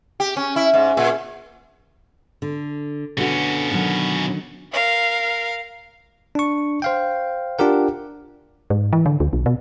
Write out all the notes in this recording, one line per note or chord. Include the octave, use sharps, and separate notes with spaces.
G4
C#4
E4
G#2
A#2
D3
B2 D3 B3 C#4 F#4
D3 D#3 F#3
A#4 F5
D4 C#6
C5 F5 G5
D4 F4 G4 A#4 F#5
G#2
E3
D3
D2
B1
B2